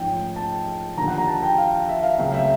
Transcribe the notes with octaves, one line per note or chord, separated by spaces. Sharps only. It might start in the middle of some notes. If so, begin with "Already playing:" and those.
Already playing: G#2 F3 A3 C#4 G5
A5
D#2 D3 F3 A#5
F#5
A#5
A5
G5
F5
E5
F5
C#2 C#3 F#3 A3 C4 F5
E5